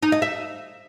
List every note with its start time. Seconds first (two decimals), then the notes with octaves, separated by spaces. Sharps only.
0.03 D#4
0.12 D#5
0.22 E5